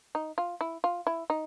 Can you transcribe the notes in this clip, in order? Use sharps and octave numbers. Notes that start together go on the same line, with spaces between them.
D#4
F4
E4
F4
E4
D#4